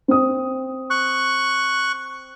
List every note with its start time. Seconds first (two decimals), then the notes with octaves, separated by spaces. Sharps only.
0.08 C4 D#6
0.90 C#6 F#6